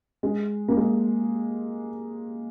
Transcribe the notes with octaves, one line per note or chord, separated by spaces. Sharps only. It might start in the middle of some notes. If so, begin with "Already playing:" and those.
G#3
A#3
G#3